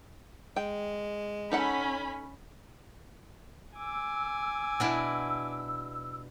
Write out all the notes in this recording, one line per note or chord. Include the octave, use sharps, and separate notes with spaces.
G#3 G5
C#4 D#4 A4 F#5 B5
G#5 D6 E6
B2 D4 E4